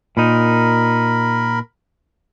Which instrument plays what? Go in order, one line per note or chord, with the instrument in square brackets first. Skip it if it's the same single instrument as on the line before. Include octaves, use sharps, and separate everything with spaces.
[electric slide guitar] A#2 D#4 [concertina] A#4 B5